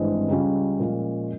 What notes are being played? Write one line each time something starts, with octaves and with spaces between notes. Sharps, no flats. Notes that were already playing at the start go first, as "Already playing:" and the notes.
Already playing: G#1 G2 E3 G#3 C4
C#2 C#3 G3 C#4 F4
A#2 F3 G#3 C#4 F4